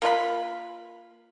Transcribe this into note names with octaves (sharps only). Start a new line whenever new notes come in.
A#3 F4 F5 B5